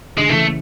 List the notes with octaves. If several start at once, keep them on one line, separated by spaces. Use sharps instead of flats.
D3 G#3
C#3 E3 A3